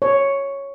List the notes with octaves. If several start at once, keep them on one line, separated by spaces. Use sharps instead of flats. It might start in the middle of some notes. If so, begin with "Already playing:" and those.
C#5